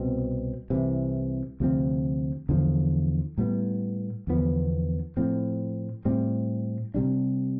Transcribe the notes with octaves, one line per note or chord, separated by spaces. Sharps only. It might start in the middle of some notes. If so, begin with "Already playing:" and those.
Already playing: C2 B2 C4
C2 C3 E3
D2 C3 F3 C4
E2 D3 F3
A2 G3 B3
E2 D3 F3 B3
A2 F3 C4
A2 G3 C4
C3 G3 D4